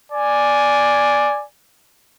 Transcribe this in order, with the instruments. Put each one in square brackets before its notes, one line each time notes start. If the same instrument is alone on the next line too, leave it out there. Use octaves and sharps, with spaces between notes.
[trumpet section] D5 G#5